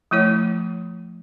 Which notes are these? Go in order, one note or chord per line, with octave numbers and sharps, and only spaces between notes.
F3 A3 E4 C#5